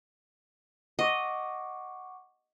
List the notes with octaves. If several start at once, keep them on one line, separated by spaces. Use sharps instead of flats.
D#5 F#5 C#6 D6